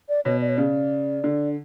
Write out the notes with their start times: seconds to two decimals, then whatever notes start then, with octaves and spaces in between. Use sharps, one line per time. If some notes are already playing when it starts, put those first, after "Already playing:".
0.09 D5
0.25 B2 C#5
0.41 D5
0.49 C#5
0.57 C#3 D5
1.24 D3